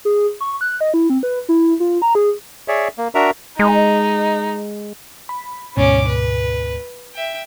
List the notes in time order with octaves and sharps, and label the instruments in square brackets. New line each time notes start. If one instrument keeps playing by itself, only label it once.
[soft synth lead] G#4
C#6
F#6
D#5
E4
C4
B4
E4
F4
A#5
G#4
[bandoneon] G#4 C#5 D5 E5
A#3
D4 F#4 A#4 E5 A#5
[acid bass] G#3 [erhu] D#4
[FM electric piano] B5
[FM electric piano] D2 G#2 B2 [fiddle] C#4 D6
[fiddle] B4
E5 G5